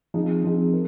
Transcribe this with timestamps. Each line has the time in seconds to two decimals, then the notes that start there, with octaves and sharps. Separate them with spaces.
0.14 F3 C4 D#4 G#4
0.44 F3 C4 D#4 G#4
0.73 A#4